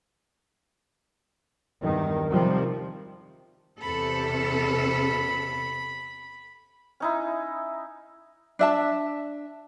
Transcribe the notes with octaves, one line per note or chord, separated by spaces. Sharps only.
E2 G2 D#3
C3 D#3 F3 G3
E2 C3 A4 B5
C#4 D#4 E4
D4 E5 A5